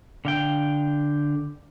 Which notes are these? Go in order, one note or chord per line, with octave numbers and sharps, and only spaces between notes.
D3 F5 G5